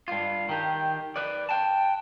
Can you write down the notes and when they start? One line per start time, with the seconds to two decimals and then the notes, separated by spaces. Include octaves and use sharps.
0.08 G2 F4
0.49 D#3 G4
1.16 B4 D5
1.49 G5 A5